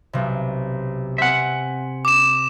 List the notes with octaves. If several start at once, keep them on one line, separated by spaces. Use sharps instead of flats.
B1 C3
C4 E5 F#5 G#5
D6 E7